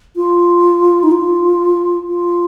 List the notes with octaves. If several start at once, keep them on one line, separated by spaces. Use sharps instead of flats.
F4
D#4
F4
F4